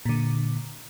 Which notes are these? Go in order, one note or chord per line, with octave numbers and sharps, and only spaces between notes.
A#2 D3